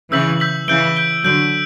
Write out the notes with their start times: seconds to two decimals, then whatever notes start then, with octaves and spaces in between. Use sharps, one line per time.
0.12 C#3 E3 E6 G6 B6 F#7
0.40 E6 G6 B6 F#7
0.68 C#3 E3 G6 D7 G7
0.96 G6 D7 G7
1.24 D3 F#3 G6 D7 F#7